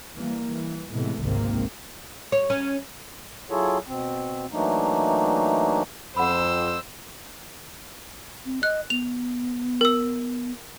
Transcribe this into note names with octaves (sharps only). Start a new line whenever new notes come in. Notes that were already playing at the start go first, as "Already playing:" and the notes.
E3 G3 A#3
E3
A2 C3 E3 G#3 A3 B3
G#1 C#2 C3 D#3 A#3 C4
C#5
C#4
F#3 E4 F4 G#4 A4 C#5
B2 C4
E3 F#3 A3 A#3 D4 D#4
F2 C5 F#5 B5 E6
C4
D#5 F#6
B3 F7
A#4 E6